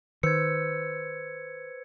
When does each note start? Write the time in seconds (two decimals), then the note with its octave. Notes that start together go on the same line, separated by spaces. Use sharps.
0.23 D#3 B4 C5 E6 G#6 C#7